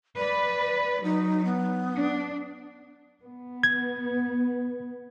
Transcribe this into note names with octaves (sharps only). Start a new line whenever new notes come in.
B4 D5
F#3 D#4
B3
D4
B3
G#6